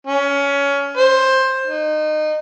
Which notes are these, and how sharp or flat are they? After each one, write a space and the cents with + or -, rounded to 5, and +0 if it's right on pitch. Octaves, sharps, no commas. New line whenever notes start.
C#4 +20
C5 +15
D#4 -25